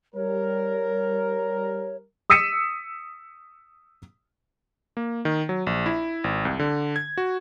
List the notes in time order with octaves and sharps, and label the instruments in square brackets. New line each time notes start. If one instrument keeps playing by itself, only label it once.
[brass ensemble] G3 A#4 [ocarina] C#5
[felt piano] D#6 E6 B6 C#7 D#7 E7
[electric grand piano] A#3
D#3
F#3
A#1
E4
G#1
C2
D3
G#6
F#4